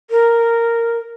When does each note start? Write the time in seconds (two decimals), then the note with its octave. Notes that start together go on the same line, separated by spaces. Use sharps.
0.10 A#4